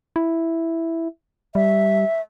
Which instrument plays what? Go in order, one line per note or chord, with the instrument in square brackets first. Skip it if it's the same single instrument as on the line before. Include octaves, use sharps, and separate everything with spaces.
[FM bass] E4
[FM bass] G3 [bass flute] E5